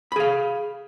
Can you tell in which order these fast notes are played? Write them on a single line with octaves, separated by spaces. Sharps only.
B5 G#4 F5